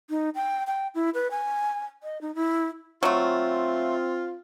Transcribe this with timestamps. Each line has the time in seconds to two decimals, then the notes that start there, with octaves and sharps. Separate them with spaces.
0.10 D#4
0.35 G5
0.67 G5
0.95 E4
1.14 B4
1.31 G#5
2.03 D#5
2.21 D#4
2.35 E4
3.03 F#3 A3 C4 F4